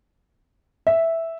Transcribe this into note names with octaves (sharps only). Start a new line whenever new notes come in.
E5